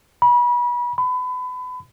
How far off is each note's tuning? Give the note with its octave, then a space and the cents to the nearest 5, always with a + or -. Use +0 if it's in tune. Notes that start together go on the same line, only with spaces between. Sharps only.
B5 -30
B5 +30